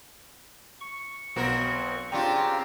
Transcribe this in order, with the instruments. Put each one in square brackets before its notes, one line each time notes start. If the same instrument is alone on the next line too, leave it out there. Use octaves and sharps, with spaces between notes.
[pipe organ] C#6
[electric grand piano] B1 B2 [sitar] C4 F#4 A#4
[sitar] C#3 D4 F4 [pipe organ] C4 G4 A#5 [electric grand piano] G5 C#6